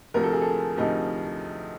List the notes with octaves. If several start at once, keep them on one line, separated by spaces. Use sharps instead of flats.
D2 C3 F3 A#4
A4
G#4
A4
D2 C3 F3 D#4